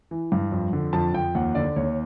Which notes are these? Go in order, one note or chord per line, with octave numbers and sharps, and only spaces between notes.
E3
G2
F2
D3
F2 A5
F2 G5
D#2 F#5
D3 D5
D#2 C#5